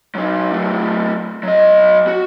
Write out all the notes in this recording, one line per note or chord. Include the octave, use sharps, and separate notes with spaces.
F#3 D#4
F#3 A3
F#3 D#5
F#4